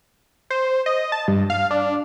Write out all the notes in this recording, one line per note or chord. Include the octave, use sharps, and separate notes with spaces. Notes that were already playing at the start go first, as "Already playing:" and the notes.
C5
D#5
A5
G2
F5
D4